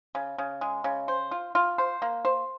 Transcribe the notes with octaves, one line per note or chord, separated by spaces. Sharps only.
C#3
C#3
G#3
C#3
C5
F4
F4
C5
A#3
C5